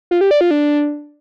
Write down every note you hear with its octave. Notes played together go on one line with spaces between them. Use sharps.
F4
G4
D5
F4
D4